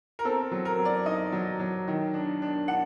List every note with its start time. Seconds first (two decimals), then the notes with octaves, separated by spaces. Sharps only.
0.19 A#4
0.25 C4 A4
0.51 F#3
0.65 A#4
0.78 F#3
0.85 D5
1.06 D#4 D#5
1.32 F#3
1.59 F#3
1.88 D#3
2.14 D4
2.42 D4
2.68 D4 F#5